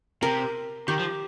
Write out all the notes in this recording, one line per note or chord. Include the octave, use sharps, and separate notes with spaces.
C3 A#4
D#3 G4
F3